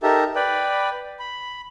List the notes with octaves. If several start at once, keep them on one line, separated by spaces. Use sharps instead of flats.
D#4 G4 A4 A#4 E5
B4 D5 G5 B5
B5